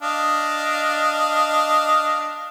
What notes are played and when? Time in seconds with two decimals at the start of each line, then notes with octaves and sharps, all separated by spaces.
0.02 D4 D#5 F5